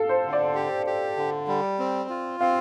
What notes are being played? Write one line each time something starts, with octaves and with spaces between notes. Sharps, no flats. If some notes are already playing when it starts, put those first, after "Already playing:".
Already playing: A4 F5
C5
D3
D5
G4
G4
D3
G3
C4
F4
C4 F5